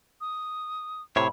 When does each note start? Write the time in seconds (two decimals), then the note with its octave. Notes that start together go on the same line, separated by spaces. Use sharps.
0.21 D#6
1.16 A2 C3 E4 C5 C#5 B5